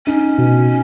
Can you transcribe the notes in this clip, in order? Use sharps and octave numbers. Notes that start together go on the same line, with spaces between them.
C#4 D#4
B2